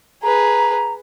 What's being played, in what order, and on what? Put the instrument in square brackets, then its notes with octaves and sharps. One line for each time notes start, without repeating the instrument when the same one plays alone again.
[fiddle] G#4 B4 [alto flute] A#5